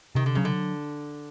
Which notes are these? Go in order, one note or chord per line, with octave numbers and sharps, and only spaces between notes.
C3 D#3
D3
C#3 F#3
D3